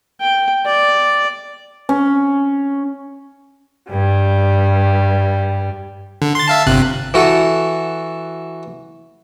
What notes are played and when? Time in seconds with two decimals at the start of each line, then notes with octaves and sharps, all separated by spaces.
0.21 G5
0.66 D5
1.89 C#4
3.90 G2 G3
6.22 D3
6.35 C6 A6
6.48 E5 F5 A5
6.66 G1 C3 F#6
7.14 E3 F#4 A4